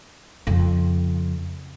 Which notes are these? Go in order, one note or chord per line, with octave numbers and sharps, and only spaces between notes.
F2 C#3